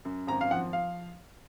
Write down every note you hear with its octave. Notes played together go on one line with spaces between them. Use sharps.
F#2
G#1 A#5
F5
F3 F#5
F5